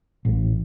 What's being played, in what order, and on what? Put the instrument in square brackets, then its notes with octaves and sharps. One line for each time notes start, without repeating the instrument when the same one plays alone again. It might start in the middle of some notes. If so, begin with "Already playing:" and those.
[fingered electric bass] A1